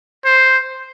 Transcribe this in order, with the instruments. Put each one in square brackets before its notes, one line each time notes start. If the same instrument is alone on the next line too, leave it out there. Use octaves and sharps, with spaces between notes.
[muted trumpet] C5